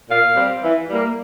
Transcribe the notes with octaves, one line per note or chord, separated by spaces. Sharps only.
A#2 F5
G3 C4
E3
G3 A#3